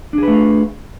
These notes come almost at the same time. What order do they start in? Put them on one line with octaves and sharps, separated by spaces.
D4 G#4 B4 A3 F4